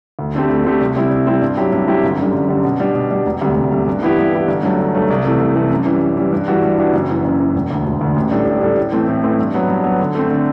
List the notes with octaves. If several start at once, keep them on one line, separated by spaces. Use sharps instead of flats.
D2
D3 A3 C4 G4
D2
D3 A3 C4 G4
C2
C3 G3 C4 E4
C2
C3 G3 C4 E4
G2
F#3 C4 E4 G4
G2
F#3 C4 E4 G4
G1
F#2 D3 G3
G1
F#2 D3 G3
B2
G3 D4
B2
G3 D4
E1
D2 C3 G3
E1
D2 C3 G3
G2
E3 B3 E4 G4
G2
E3 B3 E4 G4
G1
G2 F#3 A3
G1
G2 F#3 A3
C2
C3 E3 A3
C2
C3 E3 A3
F#2
E3 G3
F#2
E3 G3
G2
E3 G3 D4 F#4
G2
E3 G3 D4 F#4
F#1
F#2 E3
F#1
F#2 E3
E1
D2 D3
E1
D2 D3
A1
A2 G3 D4 A4
A1
A2 G3 D4 A4
A2
E3 A3 C4
A2
E3 A3 C4
G2
F#3 B3
G2
F#3 B3
D3
A3 C4
D3